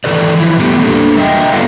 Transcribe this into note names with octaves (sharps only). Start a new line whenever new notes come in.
D#3 E3 A4 B4 D5
E3 F3 E4
A#2 G3 A3 B3 G4
A#3 D4 A4
G3 A#4 D#5 E5 G5
B3 D4 F4 A4 B4 F5